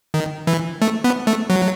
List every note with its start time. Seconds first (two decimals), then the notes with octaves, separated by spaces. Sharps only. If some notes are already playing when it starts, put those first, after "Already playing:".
0.14 D#3
0.47 E3
0.82 A3
1.04 B3
1.27 A3
1.50 F#3